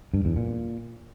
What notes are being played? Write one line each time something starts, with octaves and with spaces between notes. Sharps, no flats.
G2
E2
A#2